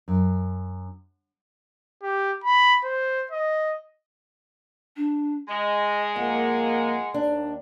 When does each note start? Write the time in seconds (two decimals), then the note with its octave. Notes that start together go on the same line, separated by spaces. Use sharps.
0.08 F#2
2.03 G4
2.44 B5
2.85 C5
3.31 D#5
4.97 D4
5.48 G#3 D#5
6.16 F2 A#3 F#5
7.14 D#2 D4